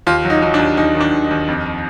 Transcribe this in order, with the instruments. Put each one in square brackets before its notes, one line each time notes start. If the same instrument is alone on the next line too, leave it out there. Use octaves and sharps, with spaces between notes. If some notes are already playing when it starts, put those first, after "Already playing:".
[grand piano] D#2 F4
F#3
D#4
F#3 D#4
D4
D#2
D#2 D#4
D#3
D4
D#2
D#4
D#2
F2